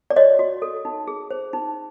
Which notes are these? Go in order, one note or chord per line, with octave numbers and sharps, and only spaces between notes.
D5
F#4 C#5 D#5
F#4
A4
D#4
G#4
C5
D#4